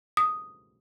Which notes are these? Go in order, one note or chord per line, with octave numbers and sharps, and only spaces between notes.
D#6